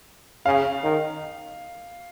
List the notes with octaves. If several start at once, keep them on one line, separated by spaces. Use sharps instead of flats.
C#3 F5
D#3